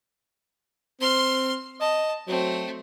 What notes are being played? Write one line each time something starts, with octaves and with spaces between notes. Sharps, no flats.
C4 C6 F6
D#5 A5
F#3 A3 C4